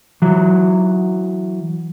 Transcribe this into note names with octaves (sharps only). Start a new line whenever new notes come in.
E3 F#3